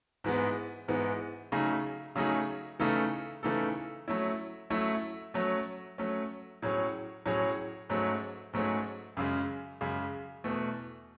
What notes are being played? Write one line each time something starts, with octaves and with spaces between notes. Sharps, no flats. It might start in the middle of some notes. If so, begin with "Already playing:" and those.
G#2 E3 G#3 B3
G#2 E3 G#3 B3
C#3 F#3 A3 D#4 G#4
C#3 F#3 A3 D#4 G#4
C#3 E3 A3 D#4 A4
C#3 E3 A3 D#4 A4
F#3 A3 C#4 E4
F#3 A3 C#4 E4
F#3 A3 C#4
F#3 A3 C#4
A2 F#3 C#4 G#4 C#5
A2 F#3 C#4 G#4 C#5
G#2 F#3 A3 C#4 G#4
G#2 F#3 A3 C#4 G#4
F#2 C#3 G#3
F#2 C#3 G#3
E2 B2 A3